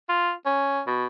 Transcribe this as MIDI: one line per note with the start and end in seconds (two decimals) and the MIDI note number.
0.09 0.32 65
0.46 0.81 61
0.87 1.06 47